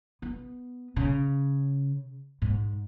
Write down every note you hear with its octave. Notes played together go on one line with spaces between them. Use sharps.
B3
C#3
G#2